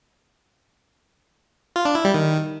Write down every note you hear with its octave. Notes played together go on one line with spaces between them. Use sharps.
F4
D4
E4
G3
D#3